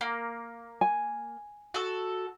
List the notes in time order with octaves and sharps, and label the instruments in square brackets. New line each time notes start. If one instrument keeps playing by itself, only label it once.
[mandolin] A#3
[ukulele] G#5
[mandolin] F#4 A4